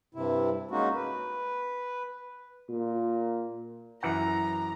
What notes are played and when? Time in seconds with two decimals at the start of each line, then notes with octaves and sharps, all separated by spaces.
0.14 G2 C3 E4
0.71 G#3 A#3 C#4 D#4 F#4
0.95 B4
2.69 A#2
4.03 F#2 E3 F#5 A#5